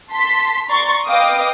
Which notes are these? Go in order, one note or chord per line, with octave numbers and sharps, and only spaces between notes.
A5 C6 B6
D5 A#5 C6 C#6 A6
B4 D#5 F5 G5 D6 D#6